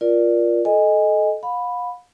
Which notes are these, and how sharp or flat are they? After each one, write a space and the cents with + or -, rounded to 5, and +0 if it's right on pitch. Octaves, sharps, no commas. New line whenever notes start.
F4 +0 A#4 +25 D5 +0
A4 -20 D#5 +0 G#5 -15
F5 +40 B5 +0